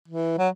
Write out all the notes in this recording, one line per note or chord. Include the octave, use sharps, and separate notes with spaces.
E3
F#3